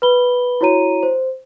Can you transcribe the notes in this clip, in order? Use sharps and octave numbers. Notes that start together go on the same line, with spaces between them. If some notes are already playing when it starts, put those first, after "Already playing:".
B4 B5 G7
E4 F#4 C#5 A#5 D#7
C5